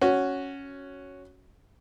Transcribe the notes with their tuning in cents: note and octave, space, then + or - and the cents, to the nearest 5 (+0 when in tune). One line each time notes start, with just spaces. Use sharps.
C#4 +0 F#4 +0